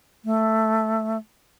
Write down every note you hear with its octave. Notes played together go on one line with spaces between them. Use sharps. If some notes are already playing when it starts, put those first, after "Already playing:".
A3